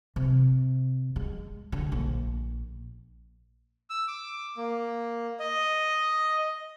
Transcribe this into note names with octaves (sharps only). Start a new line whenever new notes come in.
C3
G#3
D3
A#1
E6
D6
A#3
D#5